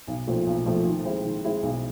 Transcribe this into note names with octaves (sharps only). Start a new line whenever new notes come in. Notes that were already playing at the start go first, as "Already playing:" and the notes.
B1
A#2 F3 A3 C4
B1
A#2 F3 A3 C4
D#3
G#3 C4 E4
D#3
G#3 C4 E4
B1